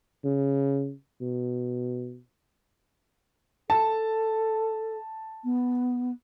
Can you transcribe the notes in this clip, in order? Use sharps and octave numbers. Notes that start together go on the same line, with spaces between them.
C#3
B2
A4 A5
B3